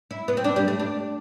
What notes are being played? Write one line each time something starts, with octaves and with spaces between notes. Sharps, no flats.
E4
B3
C4
D4
G3
A3
D4